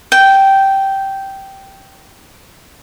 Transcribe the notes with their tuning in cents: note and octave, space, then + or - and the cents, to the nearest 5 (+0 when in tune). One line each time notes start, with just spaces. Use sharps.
G5 -10